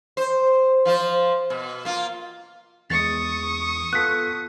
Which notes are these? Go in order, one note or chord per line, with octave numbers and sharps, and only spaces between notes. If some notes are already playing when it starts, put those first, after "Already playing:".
C5
F3 F4 C5
B2
A#3 F4
E2 G#3 C#6 D#6 A6 C#7
B3 F4 A4 F#6 B6